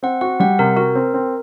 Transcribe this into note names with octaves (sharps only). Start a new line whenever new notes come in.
C4 F#5
F#4 F#5
G3 F#5
C3 A#4
F#4 A#4
C4
C4